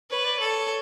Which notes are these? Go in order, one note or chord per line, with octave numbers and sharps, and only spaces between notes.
B4 C#5
D5
A4 C#5